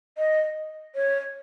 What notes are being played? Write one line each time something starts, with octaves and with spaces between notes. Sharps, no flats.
D#5
C#5